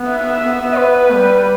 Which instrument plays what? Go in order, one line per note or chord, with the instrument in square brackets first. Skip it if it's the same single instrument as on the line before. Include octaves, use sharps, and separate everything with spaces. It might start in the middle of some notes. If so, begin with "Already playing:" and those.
Already playing: [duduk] B3
[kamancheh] E5
[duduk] B3
B3
[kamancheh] B4
[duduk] G3